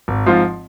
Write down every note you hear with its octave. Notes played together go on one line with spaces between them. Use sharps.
G#1
G#2 F3 C4 F4